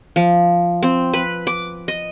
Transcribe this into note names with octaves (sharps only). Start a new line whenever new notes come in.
F3
C4
B4
D6
D#5